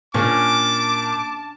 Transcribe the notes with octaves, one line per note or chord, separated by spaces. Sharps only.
A#2 A#3 C#4 D4 A5 D6